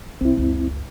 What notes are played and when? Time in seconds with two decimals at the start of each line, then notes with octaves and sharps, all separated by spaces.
0.21 C2 C4 E4
0.37 F#1 C#2